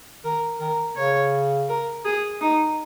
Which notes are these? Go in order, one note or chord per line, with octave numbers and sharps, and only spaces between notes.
D#3 A#4
D#3 A#4
C#3 C#5
A#4
G#4
D#4